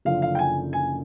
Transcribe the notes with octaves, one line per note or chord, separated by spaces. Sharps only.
F#1 F#2 D3 F3 F5
F5
G5
G#5
G#5